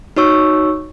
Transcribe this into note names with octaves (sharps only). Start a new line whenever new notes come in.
D#4 F#4 C#5 C#6 E6